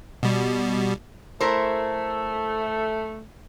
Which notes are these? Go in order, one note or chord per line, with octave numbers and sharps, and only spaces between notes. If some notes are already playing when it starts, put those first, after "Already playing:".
B2 G3
A3 E4 A#4 C5